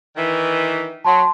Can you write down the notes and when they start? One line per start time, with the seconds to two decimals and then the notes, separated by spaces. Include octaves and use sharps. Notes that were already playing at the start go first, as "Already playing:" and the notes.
0.17 D#3 E3
1.05 F#3 A5 C6